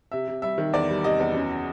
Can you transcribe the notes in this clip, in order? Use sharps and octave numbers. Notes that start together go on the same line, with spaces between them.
C3 E5
C3
G3 E5
D#3
E2 D5
G3
C3 D#5
E2
F#2